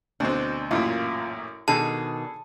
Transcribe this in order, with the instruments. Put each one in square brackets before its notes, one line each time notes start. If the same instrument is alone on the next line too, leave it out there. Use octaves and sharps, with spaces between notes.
[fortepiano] D2 B2 C4 [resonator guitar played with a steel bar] D4
[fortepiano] A1 F#2 A#2 [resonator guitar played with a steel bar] F4
[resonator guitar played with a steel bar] B2 D#3 D4 [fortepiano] G#4 A4 [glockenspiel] A5